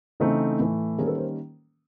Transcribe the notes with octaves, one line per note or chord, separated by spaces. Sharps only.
C#3 E3 A3 C4 D#4
A2 E3 A3
D#3 G3 A#3 C#4 G#4 A#4
A4 B4
A#4 C5